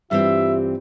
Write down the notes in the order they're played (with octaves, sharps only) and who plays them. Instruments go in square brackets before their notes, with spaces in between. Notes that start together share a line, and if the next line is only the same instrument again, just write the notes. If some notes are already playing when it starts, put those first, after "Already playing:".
[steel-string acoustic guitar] G2 E3 C4 [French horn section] F4 G4 [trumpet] E5